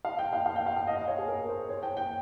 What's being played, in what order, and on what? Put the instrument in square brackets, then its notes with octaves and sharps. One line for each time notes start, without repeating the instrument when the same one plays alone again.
[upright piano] F5
G5
F5
F5
G5
F5
F5
D#5
F5
C#5
G#4
A#4
C5
C#5
G5
G5